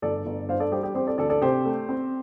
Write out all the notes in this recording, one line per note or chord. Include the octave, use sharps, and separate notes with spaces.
G1 A4 D5
G1
G2 C5 F5
A4 D5
G3 G4 C5
G4
C4 G4 C5
A4 D5
D2 A4 D5
A4 D5
C3 G4 C5
A3
C4